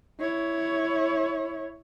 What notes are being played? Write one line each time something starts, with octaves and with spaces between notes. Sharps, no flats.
E4 C#5